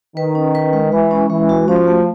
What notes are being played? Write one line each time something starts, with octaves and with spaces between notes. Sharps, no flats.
D#3 B4
C#4
B4
G#3
E3 G#3
C#4
E3 G#3
F#4
F3 C#4
A3